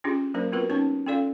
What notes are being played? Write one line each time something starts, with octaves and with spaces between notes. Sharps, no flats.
C#4 D4 F4 G4 G#4
F#3 A#3 D4 A#4 C5
B3 C4 F4 F#4 A#4 B4
C#4 D#4 C#5 A5 C#6
C#4 F4 A4 D5 F5